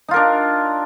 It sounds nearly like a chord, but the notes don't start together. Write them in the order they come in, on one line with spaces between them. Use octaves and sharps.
D#4 F4 A#4 D4